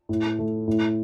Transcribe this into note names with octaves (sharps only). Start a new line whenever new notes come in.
A2
A3
A2